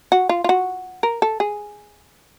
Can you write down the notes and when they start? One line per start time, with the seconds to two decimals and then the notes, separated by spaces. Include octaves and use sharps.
0.12 F#4
0.29 F4
0.44 F4
0.49 F#4
1.03 A#4
1.22 A4
1.40 G#4